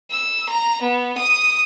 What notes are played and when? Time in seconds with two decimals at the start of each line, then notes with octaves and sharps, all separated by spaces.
0.11 E6
0.49 A#5
0.82 B3
1.17 D#6